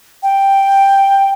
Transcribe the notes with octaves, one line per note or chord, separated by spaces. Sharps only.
G5